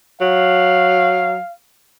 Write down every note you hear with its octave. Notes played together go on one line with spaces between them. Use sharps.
F#3 F5